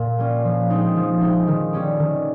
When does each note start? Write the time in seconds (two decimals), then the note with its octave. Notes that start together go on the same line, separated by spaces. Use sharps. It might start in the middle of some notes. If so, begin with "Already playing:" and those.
Already playing: A#2
0.18 G3 C#4 F4
0.44 F3
0.70 G#3 C4 D#4
0.96 F3
1.21 G#3 C4 D#4
1.47 D#3
1.73 G3 C#4 G4
1.99 D#3